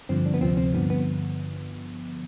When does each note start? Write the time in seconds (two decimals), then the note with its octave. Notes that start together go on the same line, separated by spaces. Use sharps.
0.09 G2 D3 F3 C4
0.26 D4
0.34 B3
0.41 D2 C3 F3 C4
0.57 C4
0.73 G2 D3 F3 B3
0.90 B3